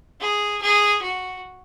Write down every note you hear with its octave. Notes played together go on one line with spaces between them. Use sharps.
G#4
G#4
F#4